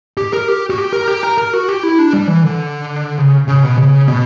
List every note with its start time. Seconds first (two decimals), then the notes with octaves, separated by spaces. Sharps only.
0.17 G4
0.33 A#4
0.48 G4
0.70 F#4
0.78 G4
0.92 A#4
1.08 G4
1.23 A#4
1.38 A#4
1.53 F#4
1.69 G4
1.83 E4
1.99 D4
2.13 G3
2.27 E3
2.43 D3
3.18 C#3
3.48 C#3
3.63 B2
3.78 C#3
4.08 B2